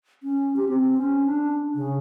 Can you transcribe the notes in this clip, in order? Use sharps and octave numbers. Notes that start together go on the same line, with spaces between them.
C#4
G4
C4
C#4
D4
C#3